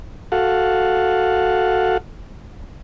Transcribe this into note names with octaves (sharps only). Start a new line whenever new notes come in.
F#4 A4 F5 F#5